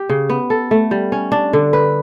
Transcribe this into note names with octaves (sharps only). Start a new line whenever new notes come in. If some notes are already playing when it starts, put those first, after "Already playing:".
Already playing: G4
C#3
B3
A4
A3
G3
C#4
D4
D3
B4